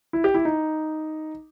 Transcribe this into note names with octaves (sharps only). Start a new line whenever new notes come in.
E4
G4
E4
D#4